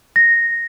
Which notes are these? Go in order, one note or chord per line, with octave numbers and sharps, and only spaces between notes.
A#6